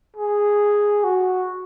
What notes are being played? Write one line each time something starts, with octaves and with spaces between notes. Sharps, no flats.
G#4
F#4